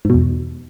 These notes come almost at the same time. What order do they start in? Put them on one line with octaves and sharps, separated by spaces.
G#2 B2 E2